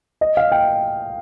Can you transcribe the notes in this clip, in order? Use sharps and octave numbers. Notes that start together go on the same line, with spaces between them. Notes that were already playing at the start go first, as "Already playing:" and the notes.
D#5
F5
G5